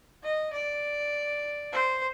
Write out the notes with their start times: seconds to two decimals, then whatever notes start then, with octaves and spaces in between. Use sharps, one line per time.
0.23 D#5
0.53 D5
1.73 C5